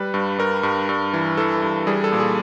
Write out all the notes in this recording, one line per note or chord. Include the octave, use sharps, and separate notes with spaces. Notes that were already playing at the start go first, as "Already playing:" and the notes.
Already playing: G3 B4
G2
G2 A#4
G2
G2
E3
E3 A4
G2
G3 G#4
A4
A#2
G#4